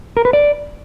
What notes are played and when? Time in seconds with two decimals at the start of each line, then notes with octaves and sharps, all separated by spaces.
0.17 A#4
0.25 B4
0.33 D5